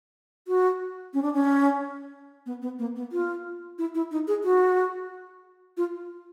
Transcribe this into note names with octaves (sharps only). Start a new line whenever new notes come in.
F#4
C#4
D4
C#4
B3
B3
A#3
B3
F4
E4
E4
D#4
G#4
F#4
F4